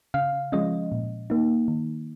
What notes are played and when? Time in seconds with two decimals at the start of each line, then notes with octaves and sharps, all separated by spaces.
0.14 C#3 F5
0.52 F3 G#3 C#4 D#5
0.92 A#2
1.30 A#3 D#4
1.68 D#3